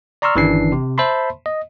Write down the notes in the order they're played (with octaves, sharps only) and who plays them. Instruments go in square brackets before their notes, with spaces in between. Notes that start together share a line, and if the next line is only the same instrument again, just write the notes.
[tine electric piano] D5 A#5 C6 C#6 E6 F6
G1 D#3 E3 C#4 D4 C7
C3
C5 E5 A5 B5 C6
D#5